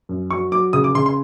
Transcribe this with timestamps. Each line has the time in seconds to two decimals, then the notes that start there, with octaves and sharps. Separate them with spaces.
0.09 F#2
0.31 F#3 C#6
0.52 F#3 D6
0.73 C#3 D#6
0.84 D6
0.95 C#3 C6
1.06 C6